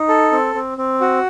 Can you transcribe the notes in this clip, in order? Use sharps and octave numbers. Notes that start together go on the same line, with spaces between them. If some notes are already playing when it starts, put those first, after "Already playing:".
Already playing: D#4
A4
C4
C4
C4
F#4